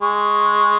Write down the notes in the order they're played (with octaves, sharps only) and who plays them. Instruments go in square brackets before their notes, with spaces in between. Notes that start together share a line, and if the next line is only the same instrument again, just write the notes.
[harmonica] G#3 [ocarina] C#6